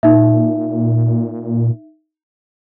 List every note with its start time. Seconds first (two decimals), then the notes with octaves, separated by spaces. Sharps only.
0.03 A#2 D#4 E5